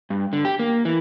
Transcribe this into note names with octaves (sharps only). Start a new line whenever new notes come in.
G2
D3
G4
A#3
E3